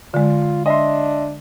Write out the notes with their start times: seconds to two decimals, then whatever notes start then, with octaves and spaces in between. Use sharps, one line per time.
0.14 D3 G#3 F4
0.66 D4 D#5 E5 C6